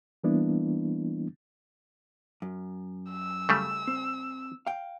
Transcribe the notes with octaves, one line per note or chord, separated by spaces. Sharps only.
E3 G3 A#3 B3 D4 E4
F#2
E6
C#3 G3 A3
C4
F5 G5